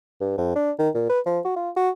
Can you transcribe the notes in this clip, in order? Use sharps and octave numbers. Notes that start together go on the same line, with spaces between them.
G2
F2
D4
D#3
A#2
B4
F3
F#4
F4
F#4